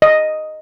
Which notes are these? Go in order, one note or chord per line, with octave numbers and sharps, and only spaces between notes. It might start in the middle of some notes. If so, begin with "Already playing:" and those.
D#5